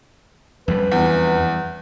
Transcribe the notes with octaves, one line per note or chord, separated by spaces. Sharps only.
F2 G3 B4
E2